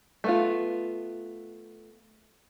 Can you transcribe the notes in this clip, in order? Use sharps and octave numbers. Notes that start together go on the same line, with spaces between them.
A3 B3 F4